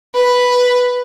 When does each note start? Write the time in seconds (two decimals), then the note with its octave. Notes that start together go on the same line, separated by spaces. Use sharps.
0.14 B4